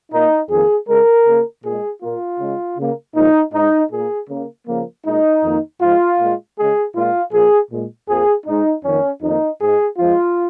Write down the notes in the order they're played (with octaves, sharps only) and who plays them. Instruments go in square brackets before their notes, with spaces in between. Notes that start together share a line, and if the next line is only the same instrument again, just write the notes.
[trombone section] A#2 A#3 D#4
F2 D#3 A#3 G#4
C#3 G#3 A#4
C#3 A#3
A#2 G#3 G#4
A#2 A#3 F4
C#3 G#3
C#3 A#3
A#2 F3 G#3 D#4
G#2 G#3 D#4
A#2 A#3 G#4
C#3 A#3
C#3 F3 A#3
A#2 G#3 D#4
F2 D#3 A#3
G#2 F3 G#3 F4
A#2 G#3
C#3 G#3 G#4
A#2 G#3 F4
A#2 F3 A#3 G#4
A#2 G#3
F2 F3 A#3 G#4
G#2 G#3 D#4
F2 D#3 A#3 C#4
F2 D#3 A#3 D#4
G#2 G#3 G#4
F2 F3 G#3 F4